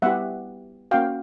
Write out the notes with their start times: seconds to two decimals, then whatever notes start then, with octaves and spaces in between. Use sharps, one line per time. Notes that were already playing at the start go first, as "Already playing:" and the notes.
0.02 G3 B3 E4 G4 E5 F#5
0.91 A#3 C#4 F#4 F5 G5